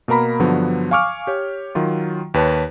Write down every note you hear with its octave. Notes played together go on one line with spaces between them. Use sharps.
B2 A#3 A#4 A#5 B5
G2 D3 F3 F#3 B3
F5 G#5 C#6 D6 F6
G4 C#5
D#3 F#3 F4
D#2 B4 C#5 A5